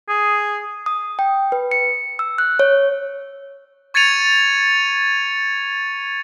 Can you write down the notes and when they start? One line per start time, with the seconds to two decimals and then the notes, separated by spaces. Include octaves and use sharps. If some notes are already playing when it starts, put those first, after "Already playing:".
0.09 G#4
0.86 D#6
1.19 G5
1.52 B4
1.71 C#7
2.19 E6
2.38 F#6
2.59 C#5
3.94 C#6 G#6 A6 C#7 D#7 F7